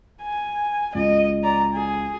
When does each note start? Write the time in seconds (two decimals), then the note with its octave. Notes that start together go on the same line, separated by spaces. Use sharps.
0.22 G#5
0.95 C#2 D#5
1.44 D5 A#5
1.73 G#4